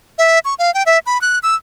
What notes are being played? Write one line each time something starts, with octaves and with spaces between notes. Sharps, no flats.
E5
C#6
F5
G5
E5
B5
F#6
E6